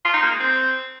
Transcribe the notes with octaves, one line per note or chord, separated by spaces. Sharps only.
F4
D#4
A#3
G#3
C4